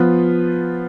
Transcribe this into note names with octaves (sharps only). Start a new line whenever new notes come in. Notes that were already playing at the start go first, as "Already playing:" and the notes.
Already playing: F3 B3 F4 B4